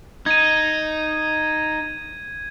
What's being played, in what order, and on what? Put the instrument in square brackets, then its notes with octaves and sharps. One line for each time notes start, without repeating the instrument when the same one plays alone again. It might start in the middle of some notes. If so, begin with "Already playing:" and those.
[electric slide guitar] D#4 [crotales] G#6 D#7